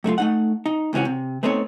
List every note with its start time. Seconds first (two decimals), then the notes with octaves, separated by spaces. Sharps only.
0.04 F#2 A3 D4 F4
0.18 A3 D#4 F#5
0.66 D#4
0.93 C#2 C3 E3 C#4 F#4
1.05 C3
1.43 A3 B3 C4 D#4 G#4 C#5